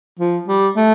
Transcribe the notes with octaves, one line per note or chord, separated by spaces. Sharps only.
F3
G3
A3